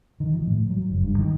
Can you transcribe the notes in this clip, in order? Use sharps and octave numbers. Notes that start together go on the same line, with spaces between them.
D#3
F3
A2
F#3
F#1
G2
D#3